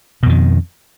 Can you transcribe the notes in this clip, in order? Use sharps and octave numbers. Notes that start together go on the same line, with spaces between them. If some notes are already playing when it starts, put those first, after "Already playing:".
F2 B2 D#3